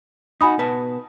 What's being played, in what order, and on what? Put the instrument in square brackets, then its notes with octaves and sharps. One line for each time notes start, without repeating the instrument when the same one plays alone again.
[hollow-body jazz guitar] D#4 F#4 [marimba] G#5 B5 D#6
[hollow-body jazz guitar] B2 B4 A5